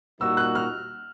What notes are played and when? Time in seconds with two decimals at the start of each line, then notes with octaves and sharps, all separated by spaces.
0.20 A#2 G3 A#3 D#4 F#4 E6
0.37 F#6
0.55 F6